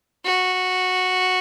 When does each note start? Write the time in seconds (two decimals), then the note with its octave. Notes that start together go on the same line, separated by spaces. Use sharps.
0.25 F#4